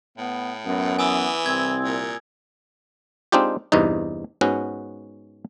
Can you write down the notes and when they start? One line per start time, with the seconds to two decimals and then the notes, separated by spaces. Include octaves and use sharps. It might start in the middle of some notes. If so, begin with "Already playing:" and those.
0.17 A2 B3
0.65 F#2 B3
0.99 E3 G#5 D#6 E6
1.46 C2 C4 G#6
1.84 A#2
3.32 G#3 C4 D4 D#4 F4 G4
3.72 E2 G2 C3 D#4
4.41 G#2 B3 C#4 F#4